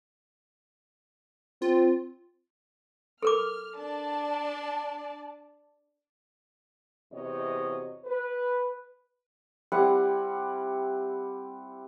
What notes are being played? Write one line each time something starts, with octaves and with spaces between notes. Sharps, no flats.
C4 F4
A4 A#4 D6 F6
D4 D5 A5
E2 C3 F#4 C#5 D#5
B4
G3 C4 E4 F#5